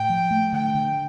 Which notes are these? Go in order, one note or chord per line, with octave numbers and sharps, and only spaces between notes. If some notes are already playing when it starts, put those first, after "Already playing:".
Already playing: A2 G5
F3
A3
D3 G5
D3